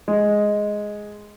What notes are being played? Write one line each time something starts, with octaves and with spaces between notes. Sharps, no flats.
G#3